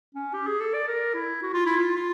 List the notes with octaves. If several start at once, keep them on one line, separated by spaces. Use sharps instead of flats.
C#4
G4
G#4
A4
D5
A#4
E4
F#4
F4
E4
F4
F4